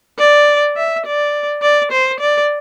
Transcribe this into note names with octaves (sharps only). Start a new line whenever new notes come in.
D5
E5
D5
D5
C5
D5